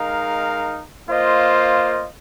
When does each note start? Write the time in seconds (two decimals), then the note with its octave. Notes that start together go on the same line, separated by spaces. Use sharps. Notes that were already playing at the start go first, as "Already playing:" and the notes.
Already playing: G#3 D#4 A#4 F5
1.07 A#3 F4 C5 D#5